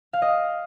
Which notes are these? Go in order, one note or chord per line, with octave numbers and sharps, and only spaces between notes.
F5
D#5